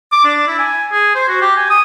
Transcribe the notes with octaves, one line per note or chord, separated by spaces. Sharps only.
D6
D4
E4
G#5
G#4
C5
F#4
G4
G#5
D#6